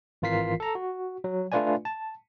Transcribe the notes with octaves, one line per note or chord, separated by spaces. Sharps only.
G#1 E3 F4 A#4 B6 C7
A4 A#5
F#4
F#3
A3 D4 F4 B4 D5 G#5
A5